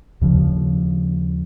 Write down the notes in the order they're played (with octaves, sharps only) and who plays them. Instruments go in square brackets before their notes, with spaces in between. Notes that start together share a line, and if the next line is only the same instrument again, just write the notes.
[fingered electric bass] D#2 C#3 F3